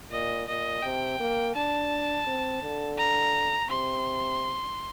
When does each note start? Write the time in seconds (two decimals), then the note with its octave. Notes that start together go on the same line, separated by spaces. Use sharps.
0.12 A#2 D#5
0.48 A#2 D#5
0.83 C3 G5
1.20 A#3
1.55 D4 A5
2.27 C4
2.62 D3
2.98 A#5
3.70 C3 C6